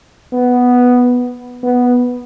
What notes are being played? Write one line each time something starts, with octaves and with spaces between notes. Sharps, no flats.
B3
B3